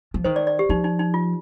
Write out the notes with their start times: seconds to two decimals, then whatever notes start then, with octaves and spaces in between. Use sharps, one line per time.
0.14 F3
0.24 D#3 C5
0.36 D5
0.47 D5
0.59 G4
0.69 F3 D#4
0.84 D#4
0.99 D#4
1.14 F4